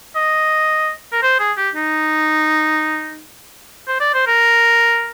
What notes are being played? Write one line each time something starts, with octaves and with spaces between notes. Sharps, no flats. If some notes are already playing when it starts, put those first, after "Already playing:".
D#5
A#4
C5
G#4
G4
D#4
C5
D5
C5
A#4